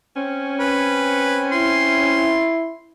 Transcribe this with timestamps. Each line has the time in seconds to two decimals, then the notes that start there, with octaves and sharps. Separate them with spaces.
0.16 C4 C#4
0.59 B4
1.52 E4 C6